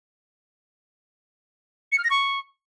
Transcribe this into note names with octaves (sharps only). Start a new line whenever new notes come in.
C#7
F6
A#6
C#6